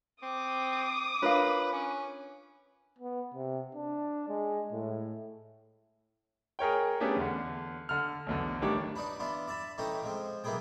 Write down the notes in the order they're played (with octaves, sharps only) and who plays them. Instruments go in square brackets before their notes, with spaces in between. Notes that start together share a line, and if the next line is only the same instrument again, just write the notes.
[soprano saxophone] C4 [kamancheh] D6 D#6
[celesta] D4 F4 C#5 [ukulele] A#4 F5 [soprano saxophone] B4
[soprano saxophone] C#4
[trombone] B3
C3
D4
G#3
A2
[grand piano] G#4 A#4 C#5 G5
A3 B3 C#4 D4 G4 G#4
E2 D3
D3 F6
B1 E2 D3
A1 D#3 G3 D4 C#5 D6
[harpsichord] D4 D#4 F#4 B4
E3 B3 D4 F4
D5 E5 A5 B5
E3 A3 C#4 D#4 G4 D#5
F3 G#3 C4
B1 E3 A#3 B3 G#4 G5